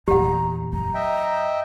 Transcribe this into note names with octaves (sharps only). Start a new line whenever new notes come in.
E2 A#2 G4 F#5 A#5
F#2 A#5
D#5 E5 G5